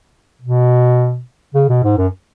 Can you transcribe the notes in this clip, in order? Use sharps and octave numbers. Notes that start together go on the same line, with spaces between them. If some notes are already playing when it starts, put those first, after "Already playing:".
B2
C#3
B2
G#2
F#2